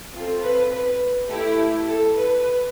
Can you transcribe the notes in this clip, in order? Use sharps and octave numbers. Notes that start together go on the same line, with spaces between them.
C4 F4 A4
B4
B4
A3 E4 G4
A4
B4